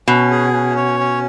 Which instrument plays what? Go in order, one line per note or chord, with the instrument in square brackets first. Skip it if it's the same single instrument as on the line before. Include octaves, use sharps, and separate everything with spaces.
[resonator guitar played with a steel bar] B2 [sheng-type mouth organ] C#4
[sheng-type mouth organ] G#4
C#4
C#5
C#4